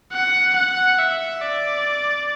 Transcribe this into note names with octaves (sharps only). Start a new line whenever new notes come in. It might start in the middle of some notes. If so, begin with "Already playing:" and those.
F#5
F#5
E5
D5